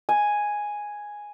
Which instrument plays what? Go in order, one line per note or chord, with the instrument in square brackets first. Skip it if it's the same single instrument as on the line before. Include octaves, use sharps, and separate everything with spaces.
[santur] G#5